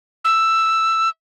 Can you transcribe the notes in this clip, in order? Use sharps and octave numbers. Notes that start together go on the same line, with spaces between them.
E6